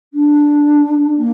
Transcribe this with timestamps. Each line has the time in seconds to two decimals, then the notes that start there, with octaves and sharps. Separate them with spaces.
0.13 D4
1.17 A#3